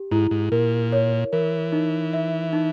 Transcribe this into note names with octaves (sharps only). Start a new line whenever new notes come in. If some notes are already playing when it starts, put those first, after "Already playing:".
Already playing: G4
G#2 E4
G#2
A#2 A#4
C#5
E3 A#4
D#4
E5
D#4